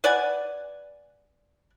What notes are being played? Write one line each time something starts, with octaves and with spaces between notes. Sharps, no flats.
B4 D5 F#5 G#5